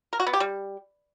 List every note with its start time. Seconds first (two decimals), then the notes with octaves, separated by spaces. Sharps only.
0.13 A#4
0.20 F#4
0.27 B3
0.33 G4
0.40 G3